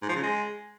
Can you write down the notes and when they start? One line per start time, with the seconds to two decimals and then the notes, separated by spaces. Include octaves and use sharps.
0.02 G#2
0.09 F3
0.16 C#3
0.23 G#3